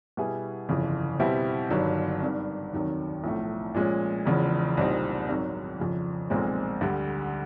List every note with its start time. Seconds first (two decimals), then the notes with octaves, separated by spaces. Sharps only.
0.17 B2 G3 B3 E4 G#4
0.69 G1 F2 C#3 E3
1.19 B2 G3 C4 E4 G4
1.70 G1 G2 D#3 F#3
2.21 G#1 G2 D#3
2.72 F1 D#2 D#3 F#3
3.24 B1 A2 F3 A3
3.75 A#2 F3 G#3 C#4
4.25 E1 E2 C#3 F3
4.77 C2 A#2 G3 C4 D#4
5.28 G#1 G#2 D#3 F#3
5.79 F2 C#3 F3
6.30 B1 A#2 F3 G#3 C4
6.81 D2 D3 G3